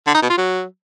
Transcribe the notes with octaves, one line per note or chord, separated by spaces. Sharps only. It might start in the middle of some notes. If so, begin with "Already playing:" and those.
D3
D#4
B2
F4
F#3